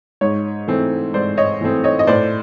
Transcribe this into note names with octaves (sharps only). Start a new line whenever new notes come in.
G#2 C#5
E3 A3 C4
G#2 C5 D5
C#5 D#5
E3 A3 C4
C#5 D#5
D#5
A2 C5 D5